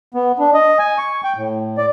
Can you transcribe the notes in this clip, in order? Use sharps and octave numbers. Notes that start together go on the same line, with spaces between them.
B3
D4
D#5
G#5
C#6
G5
A2
D5